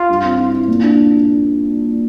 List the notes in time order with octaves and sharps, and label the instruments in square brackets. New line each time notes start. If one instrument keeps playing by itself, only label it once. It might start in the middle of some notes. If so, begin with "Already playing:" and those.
Already playing: [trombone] F4
[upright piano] G2
C4
E4
E4
A#2
D4